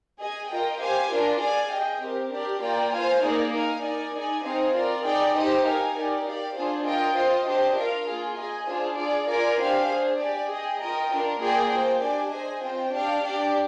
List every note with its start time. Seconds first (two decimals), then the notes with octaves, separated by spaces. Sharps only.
0.19 G#4 D#5 G#5
0.49 F4 A#4 D#5 G5
0.79 G4 C5 F5 G#5
1.10 D4 F4 A#4
1.40 G#4 D5 F5 G#5
1.71 G#4 D#5 G5
2.01 C4 G4 A#4
2.31 D4 G4 A#4 D5
2.61 A#3 F4 A#4 D5 G5
2.92 F4 C5 F5 G#5
3.22 A#3 D#4 G#4 D5
3.52 D#4 A#4 F5 G#5
3.82 D#4 A#4 D5 G#5
4.13 D#4 G#4 D5 G#5
4.43 C4 D#4 G#4 C5 F5
4.73 F4 A#4 D5
5.04 D#4 G#4 D5 G5
5.34 D#4 G4 C5 D#5 G5
5.64 D#4 A#4 F5 G#5
5.95 D#4 G4 A#4 D5
6.25 G4 D5 F5
6.55 D4 F4 G#4 C5
6.85 F4 A#4 D#5 G5
7.16 F4 C5 D#5
7.46 D4 G4 C5 D#5
7.76 F4 A#4 F5
8.07 A#3 F4 G#4
8.37 G#4 D#5 G#5
8.67 D4 F4 G#4 C5
8.97 F4 G#4 D5
9.28 F4 A#4 D5 G#5
9.59 D4 G4 C5 F5 G#5
9.89 D4 G#4 C5
10.19 G4 D5 G#5
10.49 G#4 D#5 G5
10.80 F4 A#4 D#5 G5
11.10 D4 F4 A#4
11.39 A#3 F4 G#4 D5 G5
11.70 A#3 F4 C5 G5
12.01 D4 G4 D5 G#5
12.31 G#4 C5 D#5 G#5
12.61 C4 F4 C5 G5
12.92 D4 G4 D5 F5
13.22 D4 G4 D5